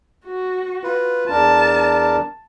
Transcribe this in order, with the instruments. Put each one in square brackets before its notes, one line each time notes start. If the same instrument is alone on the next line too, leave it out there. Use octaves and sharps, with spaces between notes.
[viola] F#4
[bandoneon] F4 B4
[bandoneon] E2 D4 A#4 [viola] A5